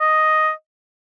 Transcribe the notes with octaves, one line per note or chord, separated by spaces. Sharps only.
D#5